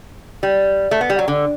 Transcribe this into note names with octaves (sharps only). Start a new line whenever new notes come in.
G3
A3
B3
G3
F#3
D3